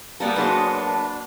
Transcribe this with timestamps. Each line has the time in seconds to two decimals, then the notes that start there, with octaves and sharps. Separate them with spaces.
0.20 G3 A#3 B3 A#4 D5 F#5 A5
0.36 F#2 G#3 B3 D4 F#4 C5